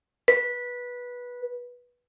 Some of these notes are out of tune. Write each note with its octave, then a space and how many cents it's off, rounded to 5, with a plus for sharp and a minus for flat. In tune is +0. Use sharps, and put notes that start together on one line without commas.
B4 -15